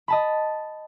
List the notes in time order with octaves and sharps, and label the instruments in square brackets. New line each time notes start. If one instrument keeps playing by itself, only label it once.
[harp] D#5 A5 B5